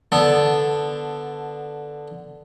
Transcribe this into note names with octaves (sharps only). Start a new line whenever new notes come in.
D3 B3 A4